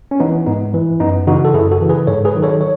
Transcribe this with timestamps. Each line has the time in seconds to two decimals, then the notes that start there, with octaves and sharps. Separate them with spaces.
0.11 C#4
0.20 E3 B3 D#4
0.47 G#2 B3 D#4
0.74 E3
1.00 F#2 B3 D#4
1.27 C#3 E3 D#4 F#4
1.45 A4
1.54 F#2 E4 G#4
1.72 F#4 A4
1.80 C#3 E3
1.89 G#4 B4
2.07 G#2 A4 C#5
2.25 G#4 B4
2.34 D#3 F#3
2.42 A4 C#5
2.61 C#5